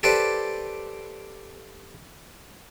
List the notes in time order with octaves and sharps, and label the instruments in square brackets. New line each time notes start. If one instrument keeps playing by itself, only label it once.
[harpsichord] G4 A4 B4 C5 D5